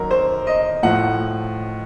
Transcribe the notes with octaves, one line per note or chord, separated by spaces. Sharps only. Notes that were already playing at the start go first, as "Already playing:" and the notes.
Already playing: F#2 D#3 F#3 A#4
C5
D#5
A2 F3 F#5